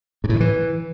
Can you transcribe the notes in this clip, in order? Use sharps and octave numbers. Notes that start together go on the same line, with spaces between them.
G#2
A2
D#3
E3